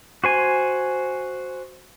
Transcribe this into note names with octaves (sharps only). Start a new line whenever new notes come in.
F#4 C5 G#5